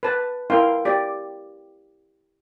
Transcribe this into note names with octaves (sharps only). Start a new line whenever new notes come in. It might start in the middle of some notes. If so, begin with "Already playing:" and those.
B4 A5
E4 A#4 F5 G5 C6
G4 D5